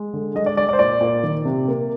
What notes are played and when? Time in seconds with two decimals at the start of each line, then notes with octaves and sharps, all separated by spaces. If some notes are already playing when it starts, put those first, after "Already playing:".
Already playing: G#3
0.14 D3
0.35 G#3 D#5
0.46 D5
0.57 G#3 D5
0.69 D5
0.73 C5
0.79 A#2 D5
1.01 A#2
1.23 D#3
1.45 C3
1.68 A#3